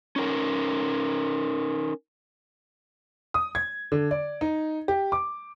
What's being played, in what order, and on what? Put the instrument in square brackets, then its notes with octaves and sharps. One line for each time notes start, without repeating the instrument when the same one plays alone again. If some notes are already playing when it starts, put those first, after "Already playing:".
[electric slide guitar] C#4 D#4 A#4
[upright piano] D#6
G#6
D3
D5
D#4
G4
D6